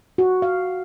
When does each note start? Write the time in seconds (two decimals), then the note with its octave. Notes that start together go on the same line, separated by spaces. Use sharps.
0.18 F#4
0.42 F5